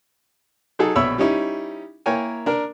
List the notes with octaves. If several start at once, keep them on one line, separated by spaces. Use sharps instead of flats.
F#3 D#4 G#4 A4
A#1 B2 C#5 E5 B5 E6
G3 C#4 D#4 E4
A#3 E4 A#4 C#5 G5 G#5
D4 A#4